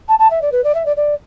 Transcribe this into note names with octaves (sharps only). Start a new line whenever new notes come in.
A5
A5
E5
D5
B4
D5
E5
D5
D5